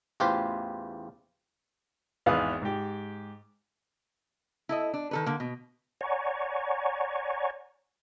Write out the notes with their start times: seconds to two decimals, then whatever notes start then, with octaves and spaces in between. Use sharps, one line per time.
0.20 A1 E2 F4 G4 B4 C5
2.26 G#1 E2 B4 F5 D#6
2.62 G#2 G4
4.69 E4 A4 D#5
4.94 D4
5.11 D#3 A4 B4
5.26 D3 A#3
5.40 B2
6.01 C#5 D5 F#5 G#5 A#5 C#6